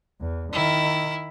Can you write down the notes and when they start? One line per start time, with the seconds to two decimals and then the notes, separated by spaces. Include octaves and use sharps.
0.20 E2
0.53 D#3 E4